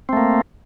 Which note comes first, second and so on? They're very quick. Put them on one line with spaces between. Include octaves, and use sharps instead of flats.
C4 A3 A#3